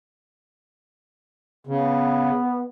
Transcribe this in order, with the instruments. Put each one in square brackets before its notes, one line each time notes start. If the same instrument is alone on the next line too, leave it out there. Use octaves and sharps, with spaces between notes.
[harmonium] C#3 [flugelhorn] B3